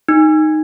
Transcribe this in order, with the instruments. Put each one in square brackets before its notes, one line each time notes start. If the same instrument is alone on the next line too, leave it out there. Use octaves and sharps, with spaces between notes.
[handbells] D#4